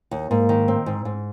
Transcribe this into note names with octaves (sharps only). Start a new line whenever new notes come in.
D#2
G#2 A#3
D#3
C4
G#2
G#2